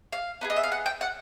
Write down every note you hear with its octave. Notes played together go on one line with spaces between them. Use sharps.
F5
B3 D#4 G#4
D#5
E5
F5
F#5
G5
F#5